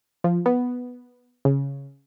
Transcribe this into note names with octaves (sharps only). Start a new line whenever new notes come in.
F3
B3
C#3